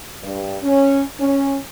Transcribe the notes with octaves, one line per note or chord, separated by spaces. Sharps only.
G2
C#4
C#4